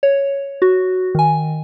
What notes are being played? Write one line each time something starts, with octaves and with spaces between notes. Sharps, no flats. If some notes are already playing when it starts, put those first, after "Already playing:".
C#5
F#4
D#3 G#5